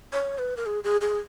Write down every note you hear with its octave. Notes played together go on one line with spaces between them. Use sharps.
C#5
B4
A#4
G#4
G#4
G#4